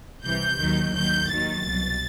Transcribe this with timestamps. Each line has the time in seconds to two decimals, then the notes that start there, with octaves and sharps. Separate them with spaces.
0.24 C2 C3 E3 G6
0.59 D#2 D#3 F#3
0.94 D#2 D#3 F#3 G6
1.28 D#2 D#3 F#3 A6
1.64 C2 B2 F#3